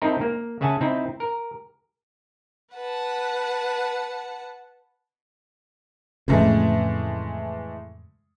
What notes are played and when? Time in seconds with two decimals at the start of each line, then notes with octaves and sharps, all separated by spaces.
0.02 C4 D#4 E4 A4 A#4
0.21 A#3
0.61 C#3 E5 F#5 G#5 A5
0.81 C4 D#4 E4
1.20 A#4
2.74 B4 F#5 A5
6.28 F2 A2 C#3 E3 G#3 A3